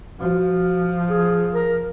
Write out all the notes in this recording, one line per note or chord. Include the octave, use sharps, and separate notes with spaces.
F3 F#4
G#4
A#4